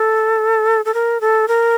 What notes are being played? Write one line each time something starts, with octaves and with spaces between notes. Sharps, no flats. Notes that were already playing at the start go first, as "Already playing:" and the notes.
Already playing: A4
A4
A#4
A4
A#4